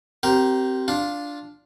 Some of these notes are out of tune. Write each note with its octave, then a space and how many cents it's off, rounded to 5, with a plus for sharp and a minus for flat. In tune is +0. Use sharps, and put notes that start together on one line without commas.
C4 +0 G4 -30 A#4 +0
D4 -5 F4 +5